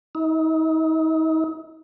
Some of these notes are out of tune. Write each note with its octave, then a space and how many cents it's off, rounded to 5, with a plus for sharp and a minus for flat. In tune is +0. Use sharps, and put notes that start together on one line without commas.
D#4 +40